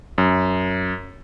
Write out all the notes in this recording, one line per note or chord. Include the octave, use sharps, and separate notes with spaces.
F#2